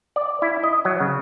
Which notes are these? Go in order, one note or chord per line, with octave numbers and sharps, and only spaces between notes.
D5
E4
D#5
F#3
C#3